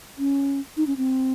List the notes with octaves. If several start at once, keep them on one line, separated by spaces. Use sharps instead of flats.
C#4
D#4
C#4
C4